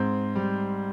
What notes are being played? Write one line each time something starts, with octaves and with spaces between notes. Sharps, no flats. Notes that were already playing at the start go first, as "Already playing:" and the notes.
Already playing: G#2 C4
G3